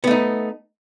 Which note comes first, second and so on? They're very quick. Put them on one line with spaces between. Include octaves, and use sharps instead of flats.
B3 A3 D#4